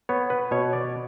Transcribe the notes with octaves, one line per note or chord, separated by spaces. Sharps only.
B3 C#5
B4
B2 C#5
D5